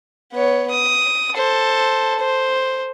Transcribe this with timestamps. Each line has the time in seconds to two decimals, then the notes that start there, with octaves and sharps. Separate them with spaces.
0.33 B3 C#5
0.71 D#6
1.35 A4 C5
2.19 C5